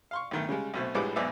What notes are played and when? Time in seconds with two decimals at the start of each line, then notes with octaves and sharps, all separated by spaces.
0.11 F5 C6 C#6
0.31 B1 D#3 A3
0.49 C#3 G3 G#3
0.74 B1 B2 A3 C4
0.95 A#1 A2 G3 G#3 B4 D6
1.16 B1 G#2 B3 D5 E5